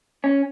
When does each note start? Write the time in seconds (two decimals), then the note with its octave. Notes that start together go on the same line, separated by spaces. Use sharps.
0.24 C#4